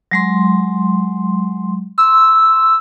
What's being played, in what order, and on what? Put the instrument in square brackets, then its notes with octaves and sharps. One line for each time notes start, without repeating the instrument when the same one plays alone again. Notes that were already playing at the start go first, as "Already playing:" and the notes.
[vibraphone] F#3 G#3 C6
[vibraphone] C6 [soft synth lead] E6